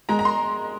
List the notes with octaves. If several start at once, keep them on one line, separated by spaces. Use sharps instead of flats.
G#3 A#5
A#5
C6